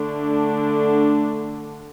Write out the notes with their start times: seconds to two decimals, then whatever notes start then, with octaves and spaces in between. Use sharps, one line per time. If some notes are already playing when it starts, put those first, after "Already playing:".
Already playing: D3 A3 D4